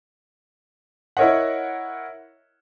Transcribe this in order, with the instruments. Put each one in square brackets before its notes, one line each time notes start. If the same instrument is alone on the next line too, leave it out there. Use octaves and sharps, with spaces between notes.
[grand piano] E4 A#4 C#5 D#5 F#5